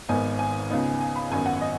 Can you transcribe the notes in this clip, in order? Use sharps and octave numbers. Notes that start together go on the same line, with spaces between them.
G#1 G#2 D#3 B3 D#4 G#5
G#5
C#2 C#3 B3 D#4
G#5
B5
G#1 F#2 D#3 B3 D#4 G#5
F#5
D#5